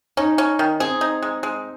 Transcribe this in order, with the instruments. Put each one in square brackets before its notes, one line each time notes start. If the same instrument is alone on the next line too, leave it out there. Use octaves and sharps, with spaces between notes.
[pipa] C#4 [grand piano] D#4
[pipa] C#4
D#3
[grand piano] C4 [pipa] G#4
[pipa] D#4
G#3
G#3